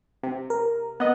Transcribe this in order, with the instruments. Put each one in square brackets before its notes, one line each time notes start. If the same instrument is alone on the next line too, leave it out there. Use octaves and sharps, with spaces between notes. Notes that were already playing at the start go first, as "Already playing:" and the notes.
[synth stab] C3
[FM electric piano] A#4
[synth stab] B3 D#5 [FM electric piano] F#6